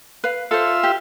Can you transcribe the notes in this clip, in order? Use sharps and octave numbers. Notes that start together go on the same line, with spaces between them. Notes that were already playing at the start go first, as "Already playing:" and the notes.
B4 F5
F4 A4 C5 E5
G4